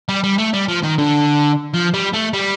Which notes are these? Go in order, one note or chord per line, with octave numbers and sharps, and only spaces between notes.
G3
G3
A3
G3
F3
D#3
D3
F3
G3
A3
G3